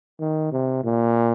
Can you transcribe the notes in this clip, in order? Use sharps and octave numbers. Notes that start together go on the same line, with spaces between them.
D#3
C3
A#2